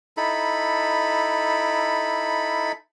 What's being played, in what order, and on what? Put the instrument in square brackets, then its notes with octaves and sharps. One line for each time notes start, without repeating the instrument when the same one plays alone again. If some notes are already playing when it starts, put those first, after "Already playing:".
[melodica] D#4 E4 A4 B5